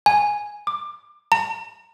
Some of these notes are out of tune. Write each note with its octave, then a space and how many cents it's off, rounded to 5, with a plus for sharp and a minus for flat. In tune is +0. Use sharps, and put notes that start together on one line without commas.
G#5 +0
D6 +20
A#5 -40